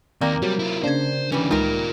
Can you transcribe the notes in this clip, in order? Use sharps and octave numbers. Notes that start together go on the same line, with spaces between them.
D#2 A#3 C4 D5 G5 A#5
C3 F#3 G3
E4 F4
C#3 A#3 D4 C5 G#6
D2 E3 G3 C#4
C#2 D#3 G#3 D#4 F4 A#4 D5